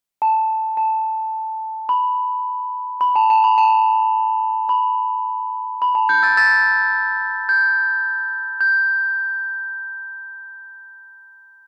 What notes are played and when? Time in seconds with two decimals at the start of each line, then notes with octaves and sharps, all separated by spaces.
0.22 A5
0.77 A5
1.89 B5
3.01 B5
3.16 A5
3.30 A5
3.44 B5
3.58 A5
4.69 B5
5.82 B5
5.95 A5
6.09 G6
6.23 E6 A6
6.37 E6 A6
7.49 G6
8.61 G6